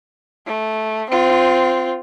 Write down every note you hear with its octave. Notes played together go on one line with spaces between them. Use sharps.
A3
C4 F4